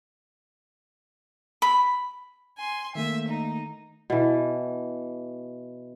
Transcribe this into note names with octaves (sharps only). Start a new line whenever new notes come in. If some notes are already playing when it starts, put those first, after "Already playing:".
B5
G#5 C6
D#3 A3 A#3 E5
D#4
B2 E3